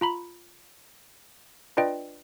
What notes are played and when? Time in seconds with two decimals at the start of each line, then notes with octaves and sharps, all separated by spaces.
0.01 F4 A#5 B5
1.77 D4 F4 B4 D5 D#5 G5